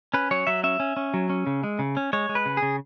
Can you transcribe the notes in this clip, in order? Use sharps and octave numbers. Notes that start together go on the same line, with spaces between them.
C#4 B4
F#3 C#5
F#3 E5
C#4 E5
C#4
C#4
F#3
C#4
C#3
G#3
C#3
C#4
G#3 C#5
G#3
B4
C#3
G#4
C#3